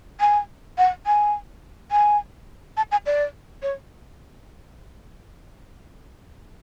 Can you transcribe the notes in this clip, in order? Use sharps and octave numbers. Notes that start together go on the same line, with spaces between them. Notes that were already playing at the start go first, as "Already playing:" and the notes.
G#5
F#5
G#5
G#5
A5
G#5
D5
C#5